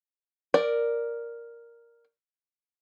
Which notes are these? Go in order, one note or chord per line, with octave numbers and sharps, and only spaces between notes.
A#4 D5